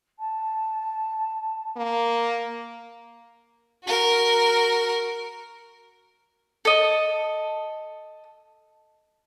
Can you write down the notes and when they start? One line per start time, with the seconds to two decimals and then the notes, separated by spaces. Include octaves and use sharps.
0.19 A5
1.77 A#3
3.84 F#4 A#4
6.65 A4 D#5